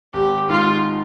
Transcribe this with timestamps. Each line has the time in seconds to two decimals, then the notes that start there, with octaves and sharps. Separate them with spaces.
0.13 G#1 G4
0.49 G#2 D#3 G#3 D#4 F4